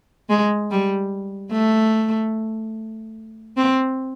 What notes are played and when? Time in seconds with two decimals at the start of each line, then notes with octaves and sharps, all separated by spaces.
0.30 G#3
0.71 G3
1.52 A3
3.57 C4